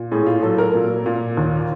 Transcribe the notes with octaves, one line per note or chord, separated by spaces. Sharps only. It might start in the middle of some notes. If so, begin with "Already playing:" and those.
Already playing: A#2
A2 G#4
F4
F#3 A4
A#4
A#2
A#2
D#2